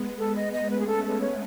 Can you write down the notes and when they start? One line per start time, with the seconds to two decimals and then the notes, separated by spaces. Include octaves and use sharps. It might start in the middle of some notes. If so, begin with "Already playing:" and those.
Already playing: G#3 B3
0.19 A4
0.36 D#5
0.53 D#5
0.70 A3 C#4 B4
0.80 G#4
0.87 A4
1.04 A4
1.21 C#5